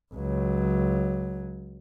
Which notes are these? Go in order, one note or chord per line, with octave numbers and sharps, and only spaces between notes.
C#2 F#3